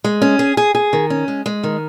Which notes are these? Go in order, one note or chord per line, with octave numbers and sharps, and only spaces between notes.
G#3
C#4
G#4
G#4
G#4
D#3
C#4
G#3
G#3
D#3